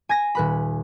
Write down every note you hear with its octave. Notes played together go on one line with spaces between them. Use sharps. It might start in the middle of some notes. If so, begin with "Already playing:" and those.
G#5 G#6 A#6
D#1 B4 B5